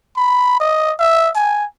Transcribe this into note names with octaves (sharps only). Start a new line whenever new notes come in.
B5
D#5
E5
G#5